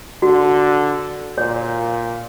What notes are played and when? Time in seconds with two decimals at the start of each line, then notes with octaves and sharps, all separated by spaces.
0.22 D3 F#4
1.38 A#2 C#5